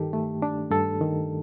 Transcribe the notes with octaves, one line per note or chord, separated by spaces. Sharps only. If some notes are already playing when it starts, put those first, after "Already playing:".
Already playing: G2 D#3 G4 A4
A3
D4
G2 A4
D#3